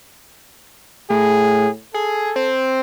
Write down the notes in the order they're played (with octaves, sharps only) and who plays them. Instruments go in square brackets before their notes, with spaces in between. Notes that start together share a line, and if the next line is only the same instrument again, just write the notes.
[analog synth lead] A2 [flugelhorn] G#4
[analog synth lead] G#4 [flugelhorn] A4
[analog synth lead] C4